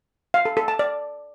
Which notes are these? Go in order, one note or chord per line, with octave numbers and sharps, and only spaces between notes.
F5
A4
A4
A5
D5